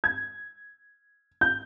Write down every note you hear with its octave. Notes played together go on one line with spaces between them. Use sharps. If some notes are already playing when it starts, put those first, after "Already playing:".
G#6
G6